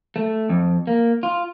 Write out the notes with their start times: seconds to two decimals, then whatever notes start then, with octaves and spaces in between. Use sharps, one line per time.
0.16 A3
0.49 F2
0.87 A#3
1.23 F4